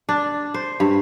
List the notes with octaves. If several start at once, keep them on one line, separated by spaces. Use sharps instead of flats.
D4
C5
G2